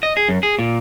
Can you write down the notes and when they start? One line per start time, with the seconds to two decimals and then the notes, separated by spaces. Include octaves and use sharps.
0.03 D#5
0.17 G#4
0.29 F#2
0.43 G#4
0.59 A#2